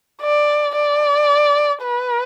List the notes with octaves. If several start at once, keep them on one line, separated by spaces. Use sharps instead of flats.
D5
D5
B4